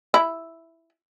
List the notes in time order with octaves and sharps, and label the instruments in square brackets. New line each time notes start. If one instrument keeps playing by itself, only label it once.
[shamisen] E4